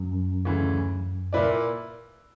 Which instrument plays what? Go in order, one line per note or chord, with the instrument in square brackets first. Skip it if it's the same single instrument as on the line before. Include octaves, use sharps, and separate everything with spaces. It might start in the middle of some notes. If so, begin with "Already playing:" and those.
Already playing: [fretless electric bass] F#2
[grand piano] D2 C#3 E3
A#2 A#3 E4 B4 D5